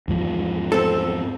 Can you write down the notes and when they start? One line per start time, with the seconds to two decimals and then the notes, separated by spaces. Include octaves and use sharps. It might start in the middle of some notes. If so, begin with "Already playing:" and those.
0.08 E2 G#2 F3
0.72 C4 A4